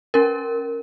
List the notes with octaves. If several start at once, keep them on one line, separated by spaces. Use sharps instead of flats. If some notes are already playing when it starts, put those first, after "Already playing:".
C#4 A#4